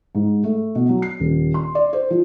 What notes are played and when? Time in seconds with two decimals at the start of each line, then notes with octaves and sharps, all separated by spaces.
0.15 G#2
0.44 A3
0.75 B2
0.89 F#3
1.02 C7
1.20 D#1
1.54 C6
1.75 D5
1.93 C5
2.10 F3